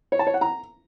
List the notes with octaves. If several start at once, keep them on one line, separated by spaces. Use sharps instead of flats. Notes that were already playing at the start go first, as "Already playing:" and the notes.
C#5
A5
C#5
F#5
A#5